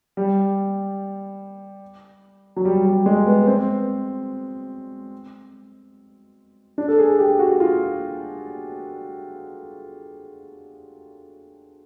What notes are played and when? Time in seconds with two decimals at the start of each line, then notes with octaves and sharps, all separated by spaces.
0.17 G3
2.56 F#3
2.65 G3
2.85 G3
3.06 G#3
3.26 B3
3.47 C4
6.78 D4
6.88 A4
6.98 G#4
7.19 G4
7.39 F#4
7.60 F4